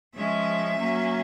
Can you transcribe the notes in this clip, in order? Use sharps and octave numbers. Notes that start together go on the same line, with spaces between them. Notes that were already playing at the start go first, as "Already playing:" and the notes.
C#3 F3 G#3 C#4 E5
F#3 A#3 C#4